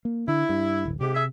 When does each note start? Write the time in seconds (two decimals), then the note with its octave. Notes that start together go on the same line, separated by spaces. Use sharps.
0.05 A#3
0.28 D3 E4
0.49 G2
0.85 D1 G1
1.01 G#2 C3 G4
1.14 G#4 E5